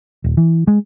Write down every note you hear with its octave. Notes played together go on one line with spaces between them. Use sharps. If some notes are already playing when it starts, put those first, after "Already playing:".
D#1
E3
G#3